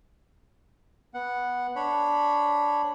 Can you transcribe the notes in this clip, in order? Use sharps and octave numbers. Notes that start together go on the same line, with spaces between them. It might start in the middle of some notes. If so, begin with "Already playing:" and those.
B3 F#5
D4 C#5 B5